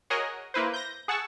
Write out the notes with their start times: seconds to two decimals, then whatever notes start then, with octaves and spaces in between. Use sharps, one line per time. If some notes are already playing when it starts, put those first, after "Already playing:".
0.10 F#4 G#4 A#4 C#5 D#5
0.54 A#3 E4 B4 C5
0.74 G6 A#6
1.08 G#4 F#5 A5 C#6 E6